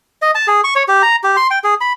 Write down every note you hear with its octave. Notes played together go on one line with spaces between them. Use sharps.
D#5
A5
G#4
C#6
C#5
G4
A#5
G4
C6
G5
G#4
B5